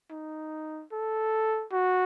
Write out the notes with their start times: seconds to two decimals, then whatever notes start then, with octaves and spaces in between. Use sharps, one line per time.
0.11 D#4
0.92 A4
1.73 F#4